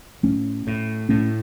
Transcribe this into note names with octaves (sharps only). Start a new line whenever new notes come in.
A2 A3 C#4
A2
A2 A3 C#4